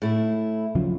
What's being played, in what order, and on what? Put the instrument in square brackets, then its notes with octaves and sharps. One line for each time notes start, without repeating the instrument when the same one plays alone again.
[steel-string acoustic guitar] A2 E4
[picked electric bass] F#2 C#3 F3